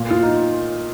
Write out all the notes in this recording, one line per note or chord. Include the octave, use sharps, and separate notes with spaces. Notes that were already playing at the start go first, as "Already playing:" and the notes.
Already playing: A#2
F4
D#4